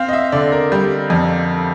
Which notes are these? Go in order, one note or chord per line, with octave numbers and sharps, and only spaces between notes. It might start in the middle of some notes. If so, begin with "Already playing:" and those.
Already playing: C4 F5
D#5
E5
D3 D5
A#4
G3
F2